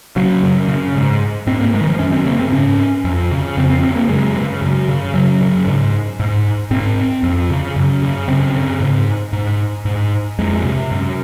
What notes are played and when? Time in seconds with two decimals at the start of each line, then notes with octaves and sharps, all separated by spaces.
0.16 C#3 F#3
0.43 F#2
0.68 C#3
0.96 G#2
1.47 G#2 C4
1.60 A#3
1.74 G#3
1.81 D#3
1.87 F3
1.99 F#2 C#4
2.12 C4
2.26 C#3 A#3
2.39 C4
2.52 G#2 C#4
3.04 F2
3.31 C#3
3.57 F2 C4
3.70 C4
3.83 C#3 C4
3.96 A#3
4.09 F#2 G#3
4.36 C#3
4.62 F#2
4.88 C#3
5.14 F#2 F#3
5.41 C#3
5.67 G#2
6.20 G#2
6.71 G#2 C4
7.23 F2
7.50 C#3
7.76 F#2
8.02 C#3
8.28 F#2 C4
8.55 C#3
8.80 G#2
9.33 G#2
9.85 G#2
10.39 F2 G#3
10.64 C3
10.91 F#2